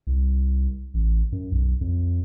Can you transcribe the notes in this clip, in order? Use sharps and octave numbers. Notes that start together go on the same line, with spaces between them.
C2
A1
F#2
B1
F2